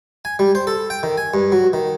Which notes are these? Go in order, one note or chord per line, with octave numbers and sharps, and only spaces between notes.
G#5
G3
C5
A4
G5
D#3
G#5
G2
F#3
D#3